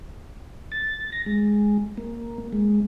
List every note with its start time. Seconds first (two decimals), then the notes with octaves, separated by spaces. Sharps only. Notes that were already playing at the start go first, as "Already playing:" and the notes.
0.72 A6
1.12 A#6
1.26 G#3
1.98 A#3
2.53 G#3